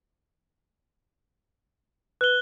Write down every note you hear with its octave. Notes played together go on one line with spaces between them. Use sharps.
B4 F#6 G7